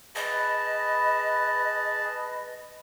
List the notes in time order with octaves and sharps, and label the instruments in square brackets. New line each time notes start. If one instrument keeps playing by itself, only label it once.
[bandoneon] G#4 A5 [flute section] B4 B5 [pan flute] D#5